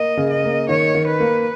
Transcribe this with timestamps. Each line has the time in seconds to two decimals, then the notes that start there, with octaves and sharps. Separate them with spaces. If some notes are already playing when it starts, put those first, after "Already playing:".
Already playing: A#3 D#5
0.17 C#3
0.30 D#5
0.44 A#3
0.69 D#3 C#5
0.95 D#3
1.08 B4
1.20 A#3